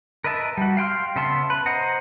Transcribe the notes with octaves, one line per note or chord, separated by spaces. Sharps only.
A#4 B4 D#5 E5 A5
G3 F#4
F5 G5 C6 F6
C#3 B3 E5 A5 C6
B4
C5 D#5 F#5 A#5